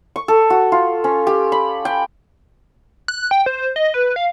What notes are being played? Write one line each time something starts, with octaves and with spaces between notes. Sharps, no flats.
C#6
A4
F#4
F4
C#4
G4
B5
G5
F#6
G5
C5
D#5
B4
F5